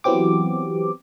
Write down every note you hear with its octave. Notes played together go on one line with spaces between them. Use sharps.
E3 F#3 B3 C4 G4 D6